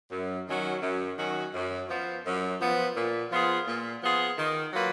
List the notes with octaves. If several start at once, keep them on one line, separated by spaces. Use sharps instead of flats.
F#2
D#3 F#3 C#4 F#4
F#2
D#3 F#3 C#4 F#4
F#2
F3 B3
F#2
F3 B3
A#2
F3 B3 F4 G#4
A#2
F3 B3 F4 G#4
D#3
F#3 A#3 F4 B4